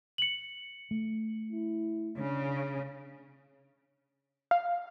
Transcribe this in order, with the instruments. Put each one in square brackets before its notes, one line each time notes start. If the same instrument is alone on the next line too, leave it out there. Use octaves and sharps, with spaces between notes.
[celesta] C#7 F#7
[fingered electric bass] A3
[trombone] E4
[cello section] C#3 [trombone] D4
[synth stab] F5